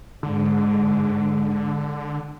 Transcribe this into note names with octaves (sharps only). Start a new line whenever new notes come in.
G#2 D3 G#3